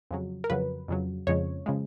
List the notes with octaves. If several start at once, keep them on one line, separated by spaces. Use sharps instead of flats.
F2 C#3 F#3
A#4
F2 C#3 F#3 B4
F2 C#3 F#3
F2 C#3 F3 G#3 C#5
C#3 F3 G#3